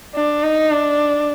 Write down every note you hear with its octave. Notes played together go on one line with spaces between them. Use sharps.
D4
D#4
D4